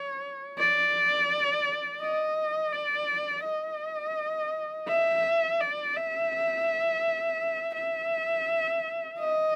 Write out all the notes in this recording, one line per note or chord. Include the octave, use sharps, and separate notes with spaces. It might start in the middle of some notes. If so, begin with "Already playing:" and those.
Already playing: C#5
D5
D#5
D5
D#5
E5
D5
E5
E5
D#5